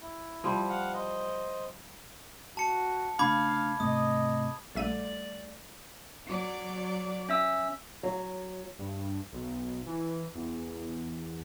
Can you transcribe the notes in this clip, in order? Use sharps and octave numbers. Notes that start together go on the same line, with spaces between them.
E4
F3 G3
F5 F#5
C5 D#5
F#4 A5 C#7
C#3 A3 D4 F5 B5 D6 G#6
G#2 C3 A3 D#5 D#6
A#1 G3 A3 A4 D5 E5 D#7
F#3 D5
C#4 E5 E6
F#3
G2
B1
E3
E2